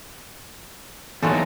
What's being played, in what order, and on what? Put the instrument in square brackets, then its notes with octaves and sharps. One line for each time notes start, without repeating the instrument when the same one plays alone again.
[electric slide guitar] E2 A#3 D#4 [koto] F#3 G#3 A4